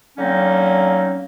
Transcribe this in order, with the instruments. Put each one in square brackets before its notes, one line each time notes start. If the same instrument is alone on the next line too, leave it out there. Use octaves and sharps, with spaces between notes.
[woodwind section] D3 F#3 A#3 C4 C#4 D#4